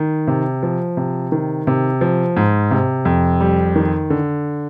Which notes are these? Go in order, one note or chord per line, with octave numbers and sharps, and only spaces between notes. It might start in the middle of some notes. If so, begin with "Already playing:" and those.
Already playing: D#3
C3
F3
C3
D#3
C3
F3
G#2
C3
F2
G3
D#3
D3